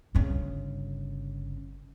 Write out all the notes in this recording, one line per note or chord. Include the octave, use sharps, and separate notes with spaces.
G1 C#3